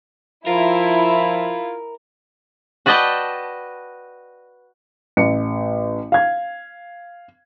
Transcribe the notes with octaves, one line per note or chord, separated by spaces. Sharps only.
F3 E4 F4 A#4
F#4 B4 D5 D#5 G5 A5
A1 C#7
F5 G#6